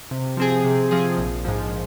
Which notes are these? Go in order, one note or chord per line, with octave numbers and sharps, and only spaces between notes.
C3
F3 C4 G#4
C3
F3 C4 G#4
A#1
G#2 F3